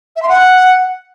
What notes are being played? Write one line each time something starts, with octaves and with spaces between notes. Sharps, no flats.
E5
C6
F#5